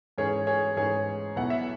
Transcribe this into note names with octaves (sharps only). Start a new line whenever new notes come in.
G#2 E3 C#4 G#4 C#5
G#4 C#5
G#2 E3 C#4 G#4 C#5
B1 B2 B3 E4 F#5
E5